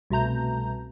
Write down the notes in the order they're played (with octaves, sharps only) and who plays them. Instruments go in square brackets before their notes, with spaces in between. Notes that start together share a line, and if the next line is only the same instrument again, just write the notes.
[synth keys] C2 B2 A3 A#5 G6